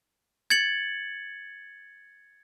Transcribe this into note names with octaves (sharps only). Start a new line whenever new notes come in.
G#6 A6 C#7 F#7